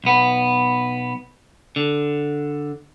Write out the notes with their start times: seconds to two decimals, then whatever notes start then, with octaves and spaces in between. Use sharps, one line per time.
0.04 B1 B3
1.76 D3